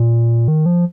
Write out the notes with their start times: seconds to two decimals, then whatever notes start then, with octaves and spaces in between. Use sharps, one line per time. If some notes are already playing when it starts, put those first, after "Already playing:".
Already playing: A#2
0.48 D#3
0.66 F3